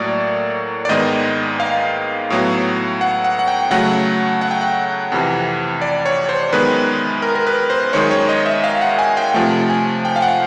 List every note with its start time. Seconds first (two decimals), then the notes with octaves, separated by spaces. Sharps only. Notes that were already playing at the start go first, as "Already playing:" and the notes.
Already playing: A2 F#3 A#3 D5
0.85 D5
0.89 G#2 D#3 G#3 B3 D#5
1.60 F5
2.30 A2 F#3 B3
3.01 F#5
3.24 F#5
3.39 F#5
3.47 G5
3.71 C#3 F#3 A3 F#5
4.41 F#5
4.51 G5
4.61 F#5
5.12 F2 C3 E3
5.82 D5
6.05 C#5
6.29 C5
6.53 F#2 D#3 G#3 B3 B4
7.22 A#4
7.35 A#4
7.47 B4
7.70 C5
7.93 F#2 D#3 G#3 C#5
8.11 C#5
8.29 D#5
8.46 E5
8.64 F5
8.81 F#5
8.99 G#5
9.17 G5
9.34 C3 F3 A3
9.70 G#5
10.05 G5
10.16 F5
10.22 F#5